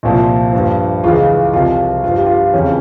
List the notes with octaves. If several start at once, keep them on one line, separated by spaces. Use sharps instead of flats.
C2 A#2 F3
G2 F3
C#2 C#3 E3 F4
C2 C3 F3 F4
G2 F3 F4
G4
F4
F2 C#3 E3 C#4